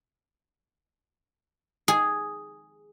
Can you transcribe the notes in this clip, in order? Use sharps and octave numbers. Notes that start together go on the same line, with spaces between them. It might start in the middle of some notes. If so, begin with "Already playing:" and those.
G#4